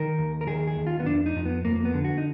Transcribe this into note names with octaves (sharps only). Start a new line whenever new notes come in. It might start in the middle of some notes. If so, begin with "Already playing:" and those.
Already playing: D#3 A#4
D#2
A#4
D#3 G#4
G#4
D#2
F4
B3
F2 D4
D#4
F2
B3
F2 A#3
A#3
B3
D3
F#4
D#4